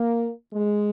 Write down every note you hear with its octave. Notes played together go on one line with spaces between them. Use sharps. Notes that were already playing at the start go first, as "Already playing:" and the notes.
Already playing: A#3
G#3